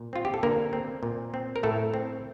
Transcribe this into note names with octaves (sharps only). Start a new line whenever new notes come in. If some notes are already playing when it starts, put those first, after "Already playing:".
Already playing: A#2
C4 F4
G4
A4
D3 A#3 A#4
C4
A#2
C4
A#4
A2 A3 A4
C4